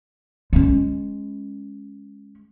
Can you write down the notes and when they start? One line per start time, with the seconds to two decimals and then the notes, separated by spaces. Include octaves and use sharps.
0.53 G#3 C#4